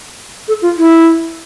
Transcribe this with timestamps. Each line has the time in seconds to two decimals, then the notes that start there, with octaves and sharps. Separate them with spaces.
0.48 A4
0.62 F4
0.77 E4